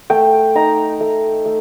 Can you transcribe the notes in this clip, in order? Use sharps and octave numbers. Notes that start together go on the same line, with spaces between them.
A3 G5
D#4 A#5
A3
A3